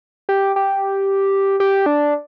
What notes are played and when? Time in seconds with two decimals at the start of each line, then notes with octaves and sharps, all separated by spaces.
0.29 G4
0.56 G4
1.60 G4
1.86 D4